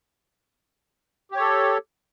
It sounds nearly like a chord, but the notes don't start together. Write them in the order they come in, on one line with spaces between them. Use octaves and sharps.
G4 C#5 A4